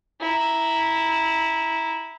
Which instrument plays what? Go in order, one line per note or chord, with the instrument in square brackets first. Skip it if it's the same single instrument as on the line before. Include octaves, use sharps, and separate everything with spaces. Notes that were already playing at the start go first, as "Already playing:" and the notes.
[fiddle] E4 A#5